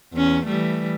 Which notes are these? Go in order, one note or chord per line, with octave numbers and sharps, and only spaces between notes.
E2 C#4
E3 G3 A3